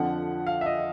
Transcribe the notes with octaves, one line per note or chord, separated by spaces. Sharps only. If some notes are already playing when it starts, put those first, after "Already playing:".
Already playing: F2 D3 F3 F#5
F5
E5
D#5